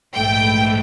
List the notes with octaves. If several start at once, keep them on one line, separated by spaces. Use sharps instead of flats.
A#1 G#2 E3 A3 G5